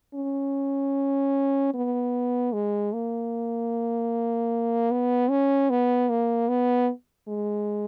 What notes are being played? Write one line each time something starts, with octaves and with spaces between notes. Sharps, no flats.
C#4
B3
G#3
A#3
B3
C#4
B3
A#3
B3
G#3